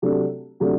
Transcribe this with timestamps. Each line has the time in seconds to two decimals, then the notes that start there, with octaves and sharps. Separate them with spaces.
0.02 C3 F#3 A3 D4 A4
0.60 C3 F#3 A3 D4